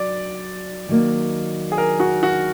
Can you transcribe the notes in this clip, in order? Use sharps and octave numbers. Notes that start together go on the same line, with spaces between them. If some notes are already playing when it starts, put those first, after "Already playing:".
Already playing: F#3 D5
D#3 F#3 A#3
G#4
A#4
F#4
F#4